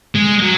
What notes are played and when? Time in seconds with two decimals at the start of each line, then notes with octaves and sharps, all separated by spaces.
0.15 G#3
0.42 F#3